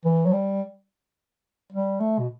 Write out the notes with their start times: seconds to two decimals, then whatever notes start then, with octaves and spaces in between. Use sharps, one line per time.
0.05 E3
0.26 F#3
0.33 G3
1.72 G3
2.00 A3
2.19 B2